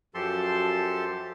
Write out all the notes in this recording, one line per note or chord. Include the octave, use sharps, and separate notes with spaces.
F#2 F3 G4 A4 A5 C6